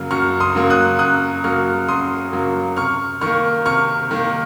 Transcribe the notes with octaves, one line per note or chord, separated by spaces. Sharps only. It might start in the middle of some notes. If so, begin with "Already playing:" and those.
Already playing: F#2 C#3 F#3 A#3 F6
F#2 C#6 F6
C6 D#6
C#3 F#3 A#3
D#6 F#6
F#2 D#6 F#6
C#3 F#3 A#3 C#6 F6
F#2 C6 D#6
C#3 F#3 A#3
C3 C#6 F6
D#3 A#3 C#6 F6
C3 C#6 F6
D#3 A#3